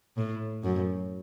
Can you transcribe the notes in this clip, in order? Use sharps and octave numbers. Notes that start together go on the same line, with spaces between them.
A2
F#2